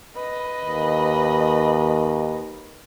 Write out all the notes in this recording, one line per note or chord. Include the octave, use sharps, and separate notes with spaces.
B4 D#5
D#2